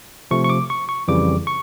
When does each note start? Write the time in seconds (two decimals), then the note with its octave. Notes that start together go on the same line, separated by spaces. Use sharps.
0.31 C3 F3 A3 C#6
0.44 C#6
0.50 D6
0.70 C#6
0.89 C#6
1.08 F2 C#3 E3 G3 D6
1.47 C#6